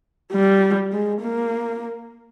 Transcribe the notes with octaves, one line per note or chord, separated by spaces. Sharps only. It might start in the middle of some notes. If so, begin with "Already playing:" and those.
G3
G#3
A#3